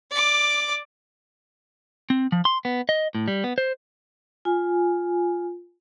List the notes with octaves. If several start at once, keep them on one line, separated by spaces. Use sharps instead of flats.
D5 D6
C4
F3
C6
B3
D#5
A2
G3
B3
C5
F4 G#5